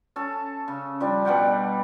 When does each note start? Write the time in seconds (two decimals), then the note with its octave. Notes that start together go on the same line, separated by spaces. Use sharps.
0.16 C#4 A4 A5
0.68 C#3
1.00 F3 G3 D4
1.25 B2 G3 F#5 G5